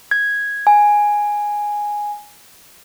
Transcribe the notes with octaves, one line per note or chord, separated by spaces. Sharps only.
G#6
G#5